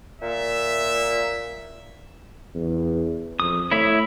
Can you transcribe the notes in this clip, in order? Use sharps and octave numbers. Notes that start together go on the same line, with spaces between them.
A#2 E5
E2
F2 D#6
A3 E4 C#5 E5